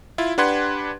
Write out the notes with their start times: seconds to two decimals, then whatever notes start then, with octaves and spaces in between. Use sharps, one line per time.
0.18 E4 F4
0.38 D4 G4 B4 F#5 C6 G#6